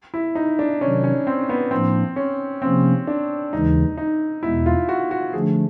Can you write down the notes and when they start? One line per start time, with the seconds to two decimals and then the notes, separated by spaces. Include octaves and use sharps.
0.14 E4
0.35 D#4
0.59 D4
0.80 C3 D#3 F#3 C#4
1.04 C#4
1.27 C4
1.49 B3
1.71 A2 F3 A#3 C4 D4
2.16 C#4
2.62 C3 F3 A#3 C4 C#4
3.07 D4
3.53 D#2 C#3 E3 G#3 D#4
3.97 D#4
4.43 E2 B2 G#3 B3 E4
4.66 F4
4.89 F#4
5.11 F#4
5.33 D3 F3 A3 D4 G#4